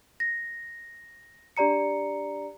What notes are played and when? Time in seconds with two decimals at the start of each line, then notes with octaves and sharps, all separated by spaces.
0.20 A#6
1.57 D4 G4 D5 A#5 C#7